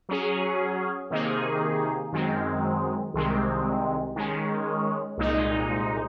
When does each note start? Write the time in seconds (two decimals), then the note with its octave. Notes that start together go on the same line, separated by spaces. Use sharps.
0.09 F#3 C#4 G#4
1.10 C3 D#3 A#3 D#4 G#4
2.13 F#2 D#3 G#3 C4
3.14 C2 C3 D#3 G#3 C4
4.16 D#3 G#3 C#4
5.18 C2 A#2 G#3 D#4